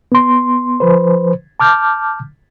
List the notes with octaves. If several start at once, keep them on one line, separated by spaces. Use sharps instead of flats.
B3 C6
F3 B4 C5
A5 D6 F6 G6